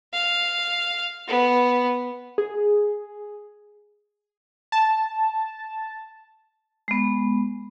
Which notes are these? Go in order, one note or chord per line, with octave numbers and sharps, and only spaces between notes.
F5
B3
G#4
A5
G#3 B3